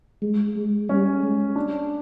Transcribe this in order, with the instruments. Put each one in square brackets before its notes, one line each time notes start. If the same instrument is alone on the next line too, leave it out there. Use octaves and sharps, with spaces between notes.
[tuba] G#3
G#3
[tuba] G3 [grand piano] C#4
[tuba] G#3
[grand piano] D4